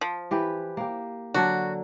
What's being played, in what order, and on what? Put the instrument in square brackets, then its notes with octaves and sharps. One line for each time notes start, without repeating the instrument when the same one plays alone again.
[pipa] F3
[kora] E3 G4 B4
A#3 G4
[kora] D3 F#3 D4 [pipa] F#4